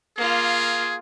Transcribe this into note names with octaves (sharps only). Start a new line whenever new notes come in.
A#3 F4 G#4